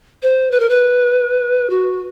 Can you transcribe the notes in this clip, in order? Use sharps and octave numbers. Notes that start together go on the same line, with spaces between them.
C5
B4
A#4
B4
F#4